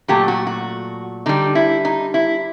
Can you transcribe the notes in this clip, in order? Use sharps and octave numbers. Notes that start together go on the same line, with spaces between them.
A#2 F#3 A3 G4
F#4
F#4
D3 G3 D#4
E4
D#4
E4